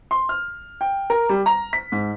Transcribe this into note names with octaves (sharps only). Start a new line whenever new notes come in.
C6
F6
G5
A#4
G3
A#5
B6
G#2